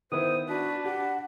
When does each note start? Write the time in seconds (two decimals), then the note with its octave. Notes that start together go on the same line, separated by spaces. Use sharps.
0.12 D#3 B3 E4 C5 D#6
0.48 D4 F#4 B4
0.85 G4 F#5